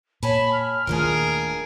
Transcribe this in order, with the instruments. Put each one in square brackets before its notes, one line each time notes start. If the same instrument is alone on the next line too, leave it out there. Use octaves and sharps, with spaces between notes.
[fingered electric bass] A#2 [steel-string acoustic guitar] C#5 G#5 A5 [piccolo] B5
[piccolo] F6
[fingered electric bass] D#1 D#2 A3 [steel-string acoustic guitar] G#3 D4 F4 [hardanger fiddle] G#4 A#4